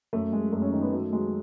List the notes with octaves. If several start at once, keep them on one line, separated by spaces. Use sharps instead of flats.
F#2 A3
F#2 G#3
F#2 A3
C#4
D#3 D#4
B3
F#3 A3
F#3 G#3